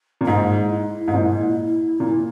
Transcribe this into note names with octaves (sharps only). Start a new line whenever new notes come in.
A#2
G#2 D#4
E4
G#2
A#2
A#2